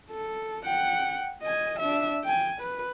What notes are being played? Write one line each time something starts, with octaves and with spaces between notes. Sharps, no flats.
A4
F#5 G5
D#5 G#5
D4 E5
G5 G#5
B4